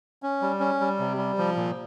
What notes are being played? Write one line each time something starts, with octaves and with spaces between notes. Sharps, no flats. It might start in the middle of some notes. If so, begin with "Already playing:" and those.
C#4
G3
C#4
G3
C3
G3
F3
A#2